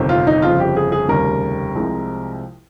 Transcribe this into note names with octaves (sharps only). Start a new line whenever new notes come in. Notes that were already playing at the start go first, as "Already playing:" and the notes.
Already playing: G1 F2 C3 D#3
F4
D#4
G1 F2 C#3 F3 F4
G4
G#4
G#4
F1 D#2 C#3 G3 A#4
C2 C3 F3 G#3